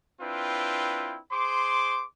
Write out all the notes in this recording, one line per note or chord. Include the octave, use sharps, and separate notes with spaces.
C4 D4 E4 F4 B4 G5
G#4 C5 C6 D6